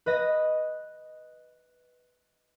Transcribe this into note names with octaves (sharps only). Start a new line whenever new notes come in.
B4 D#5 A#6